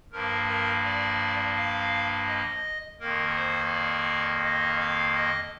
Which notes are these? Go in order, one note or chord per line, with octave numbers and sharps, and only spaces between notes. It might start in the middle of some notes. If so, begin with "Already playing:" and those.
G2 F3 A#3 A#4
A#4
D5
F5
D#5
F2 D#3 A#3 A#4
C5
D5
D#5
F5
D#5